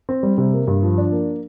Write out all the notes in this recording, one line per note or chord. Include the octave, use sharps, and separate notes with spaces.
C4
G3
C3
A#3
G2
F3
D4
A#3